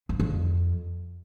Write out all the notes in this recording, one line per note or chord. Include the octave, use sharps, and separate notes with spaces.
F#2
F2